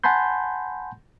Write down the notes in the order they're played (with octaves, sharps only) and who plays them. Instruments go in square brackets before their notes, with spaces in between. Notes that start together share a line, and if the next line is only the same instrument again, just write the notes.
[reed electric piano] F#5 G#5 A5 B5 C6 G6